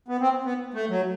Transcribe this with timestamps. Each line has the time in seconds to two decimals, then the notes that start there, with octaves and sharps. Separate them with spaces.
0.08 B3
0.21 C4
0.45 B3
0.74 A3
0.90 F#3